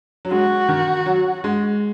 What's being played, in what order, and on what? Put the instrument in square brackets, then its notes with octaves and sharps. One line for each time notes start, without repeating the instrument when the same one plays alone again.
[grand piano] F#3
[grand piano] G#3 [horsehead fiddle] F#4
[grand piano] D#3
F#3
G#3